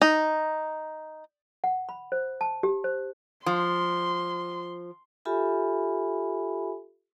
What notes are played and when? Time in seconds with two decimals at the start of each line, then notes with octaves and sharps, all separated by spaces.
0.02 D#4
1.64 F#5
1.89 B5
2.12 C5
2.41 A5
2.63 G4
2.84 C5
3.46 F3 C6
5.25 F4 G4 A4 E5 G#5 B5